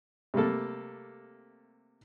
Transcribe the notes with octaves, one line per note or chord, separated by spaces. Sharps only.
C3 G3 A3 A#3 A4